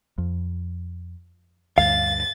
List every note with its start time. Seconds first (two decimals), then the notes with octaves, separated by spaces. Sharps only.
0.18 F2
1.78 D2 G2 F5 A6